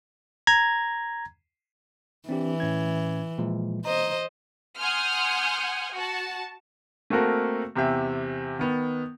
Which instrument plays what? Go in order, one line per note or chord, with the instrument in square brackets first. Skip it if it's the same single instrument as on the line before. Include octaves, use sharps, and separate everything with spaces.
[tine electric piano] A#5 G#6
[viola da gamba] E3 [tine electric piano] C4 D4 G4
[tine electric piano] A2 C#4 G#6
A#2 F3 G#3
[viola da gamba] C5 D#5 [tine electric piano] A#5
[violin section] F#5 G#5 C6 D#6 F6 G6
F#4 A5
[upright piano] A3 A#3 C4 F#4 A4 A#4
E2 C3 G4 E5
D#3 B3